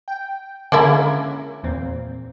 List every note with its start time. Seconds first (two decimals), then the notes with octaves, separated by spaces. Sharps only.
0.08 G5
0.72 D3 G#3 A#3 C#4 E4
1.63 E2 A#2 C4